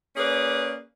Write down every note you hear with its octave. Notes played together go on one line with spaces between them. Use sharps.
A#3 C#4 G#4 B4 D5